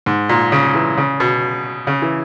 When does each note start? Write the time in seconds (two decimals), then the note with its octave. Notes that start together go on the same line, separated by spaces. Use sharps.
0.06 G#2
0.29 A#2
0.52 C#3
0.75 E3
0.97 C#3
1.20 B2
1.87 C#3
2.02 E3